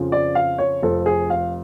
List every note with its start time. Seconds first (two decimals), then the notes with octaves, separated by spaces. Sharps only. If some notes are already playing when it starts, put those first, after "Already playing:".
Already playing: F2 C#3 F3
0.12 D5
0.35 F5
0.58 C#5
0.82 F1 F2 F3 A4
1.06 G#4
1.30 F5